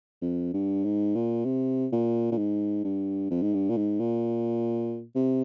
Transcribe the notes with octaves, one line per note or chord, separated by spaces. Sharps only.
F2
G2
G#2
A#2
C3
A#2
A#2
G#2
G2
F2
G#2
G2
A#2
G#2
A#2
C3